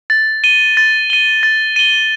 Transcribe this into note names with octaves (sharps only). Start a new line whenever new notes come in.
A6
D#7 G7
A6
D#7 G7
A6
D#7 G7